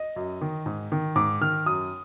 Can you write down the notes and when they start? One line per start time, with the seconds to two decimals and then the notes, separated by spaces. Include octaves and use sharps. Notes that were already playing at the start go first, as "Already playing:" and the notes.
Already playing: D#5
0.16 F#2
0.41 D#3
0.66 G#2
0.92 D#3
1.16 G#2 D6
1.41 D#3 F6
1.66 F#2 D#6